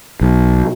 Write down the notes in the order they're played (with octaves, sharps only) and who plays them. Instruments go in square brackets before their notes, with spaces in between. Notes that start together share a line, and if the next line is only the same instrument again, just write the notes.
[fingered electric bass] B1